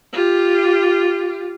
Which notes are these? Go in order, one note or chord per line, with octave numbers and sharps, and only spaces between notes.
F4 G4